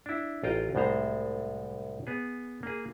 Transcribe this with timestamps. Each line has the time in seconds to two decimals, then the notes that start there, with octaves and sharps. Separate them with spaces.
0.06 D4 E4
0.43 A1 F4 D#5 G5 A#5
0.75 C2 A2 G#3 C5 A#5
2.07 B3 G#4
2.63 A#3 G#4